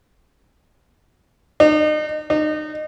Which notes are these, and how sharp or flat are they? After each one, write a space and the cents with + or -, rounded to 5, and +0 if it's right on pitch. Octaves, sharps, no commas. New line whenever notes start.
D#4 -35
D#4 -30